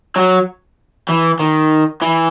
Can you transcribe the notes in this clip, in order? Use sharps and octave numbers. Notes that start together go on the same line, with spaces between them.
F#3
E3
D#3
E3